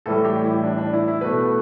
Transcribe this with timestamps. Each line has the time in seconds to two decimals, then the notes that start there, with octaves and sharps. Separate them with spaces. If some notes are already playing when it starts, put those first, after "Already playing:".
0.06 A2 E3 G3 A4
0.25 G4
0.44 E4
0.64 D4
0.78 D4
0.93 E4
1.08 E4
1.21 B2 A3 B4